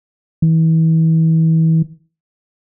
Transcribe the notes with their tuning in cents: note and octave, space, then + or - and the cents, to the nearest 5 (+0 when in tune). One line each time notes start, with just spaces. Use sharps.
E3 -35